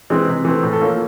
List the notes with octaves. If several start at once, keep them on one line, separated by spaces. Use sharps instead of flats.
E3 G#3 C4
C3
E3 A3 C4
A2
A4
F3 A#3 C#4 A#4